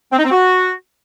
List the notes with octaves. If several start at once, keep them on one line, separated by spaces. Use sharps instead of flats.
C4
D#4
C4
F#4